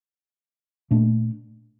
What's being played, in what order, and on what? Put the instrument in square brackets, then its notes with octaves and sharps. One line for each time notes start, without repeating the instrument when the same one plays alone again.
[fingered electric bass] A#2 A3 D4